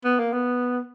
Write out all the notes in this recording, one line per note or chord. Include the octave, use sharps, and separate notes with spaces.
B3
A#3
B3